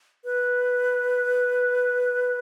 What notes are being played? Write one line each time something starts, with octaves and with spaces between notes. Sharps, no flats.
B4